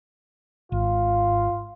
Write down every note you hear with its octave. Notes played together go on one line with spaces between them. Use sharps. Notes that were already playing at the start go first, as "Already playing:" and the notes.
G#1 F4